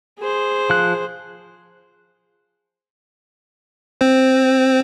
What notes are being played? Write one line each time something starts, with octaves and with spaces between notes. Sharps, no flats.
G#4 C5
F3 F#6
C4 C5